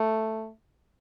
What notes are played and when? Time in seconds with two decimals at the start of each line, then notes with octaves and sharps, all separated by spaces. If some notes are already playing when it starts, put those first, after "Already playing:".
Already playing: A3